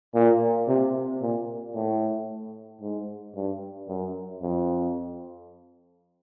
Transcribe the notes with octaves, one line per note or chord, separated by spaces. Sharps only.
A#2
C3
A#2
A2
G#2
G2
F#2
F2